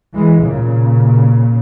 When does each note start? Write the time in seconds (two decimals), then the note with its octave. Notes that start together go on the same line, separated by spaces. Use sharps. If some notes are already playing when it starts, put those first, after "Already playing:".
0.14 E3 G#3
0.42 A#2 C#3